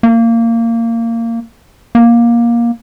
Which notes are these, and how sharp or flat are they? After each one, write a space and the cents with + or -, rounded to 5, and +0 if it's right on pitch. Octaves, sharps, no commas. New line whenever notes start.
A#3 -20
A#3 +15